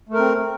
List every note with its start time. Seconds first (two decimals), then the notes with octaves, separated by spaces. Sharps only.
0.09 A3
0.14 A#4
0.19 C4